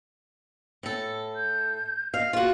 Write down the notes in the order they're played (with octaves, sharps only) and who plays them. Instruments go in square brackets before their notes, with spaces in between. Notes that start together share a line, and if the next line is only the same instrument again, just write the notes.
[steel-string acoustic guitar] A2 A4
[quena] G6
[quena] D#5 [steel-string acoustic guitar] F5
[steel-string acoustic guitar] F4 F#4 [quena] G#4